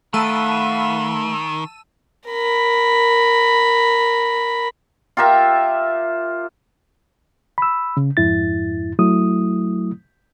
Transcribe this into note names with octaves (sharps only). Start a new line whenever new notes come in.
D#3 A3 F5 F#5 A5 B5 E6 D#7
A#4 B5
F4 G4 A#4 E5
B5 E6
C#3
F2 G#2 E4 A6
F#3 A3 E4 D#6